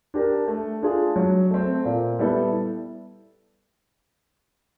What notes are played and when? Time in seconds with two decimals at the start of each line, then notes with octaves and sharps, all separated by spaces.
0.14 D4 G4 A#4
0.48 A3
0.82 D4 F4 G#4
1.16 F#3
1.51 A3 C4
1.85 A#2
2.19 G3 B3 E4 A4